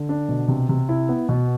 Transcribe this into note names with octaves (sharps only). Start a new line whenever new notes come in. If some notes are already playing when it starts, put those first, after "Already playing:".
Already playing: D3
D4
B2
C3
C3
E4
B3
B2